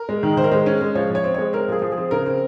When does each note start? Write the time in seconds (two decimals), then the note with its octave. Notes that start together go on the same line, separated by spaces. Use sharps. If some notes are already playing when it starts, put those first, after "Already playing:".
Already playing: A#4
0.09 G#3
0.23 D#3
0.37 D#3 C5
0.44 A#4
0.52 G#3 C5
0.66 C#4
0.81 G#3
0.95 F3 C#5
1.10 F3 C#5
1.24 C4
1.34 G#3 C#5
1.53 C4 A#4
1.68 F3 G#4
1.82 F3
1.92 G#4
1.98 C4
2.11 C#3 A#4
2.26 C4